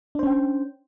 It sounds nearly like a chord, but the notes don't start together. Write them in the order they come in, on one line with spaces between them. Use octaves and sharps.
D4 C5 C#4 G5